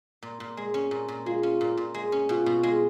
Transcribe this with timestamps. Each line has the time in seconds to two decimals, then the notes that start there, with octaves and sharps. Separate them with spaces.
0.22 A#2
0.40 A#2
0.57 G#3
0.74 C#4
0.91 A#2
1.08 A#2
1.26 G#3 F4
1.43 C#4
1.61 A#2
1.77 A#2
1.94 G#3
2.12 C#4
2.29 B2 F4
2.46 B2
2.63 G#3